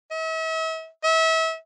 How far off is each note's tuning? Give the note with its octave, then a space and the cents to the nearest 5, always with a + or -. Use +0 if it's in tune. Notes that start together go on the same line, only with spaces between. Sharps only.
E5 -40
E5 -30